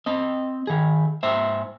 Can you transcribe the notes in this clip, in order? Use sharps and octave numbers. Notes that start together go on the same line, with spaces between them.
C4 D#5
D#3 G#4
G#2 C5 E5